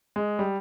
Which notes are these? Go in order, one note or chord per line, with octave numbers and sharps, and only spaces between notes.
G#3
G3